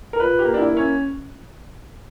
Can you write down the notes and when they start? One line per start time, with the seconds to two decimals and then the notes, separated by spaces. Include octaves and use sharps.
0.13 A#4
0.20 A#2 B4
0.39 G4
0.45 A#3
0.54 D4
0.58 E4
0.71 A#3
0.77 C#4